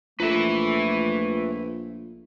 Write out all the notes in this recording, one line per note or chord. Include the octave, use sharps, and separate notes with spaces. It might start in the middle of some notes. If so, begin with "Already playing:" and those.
A#1 A3 F4 A4 B4 E5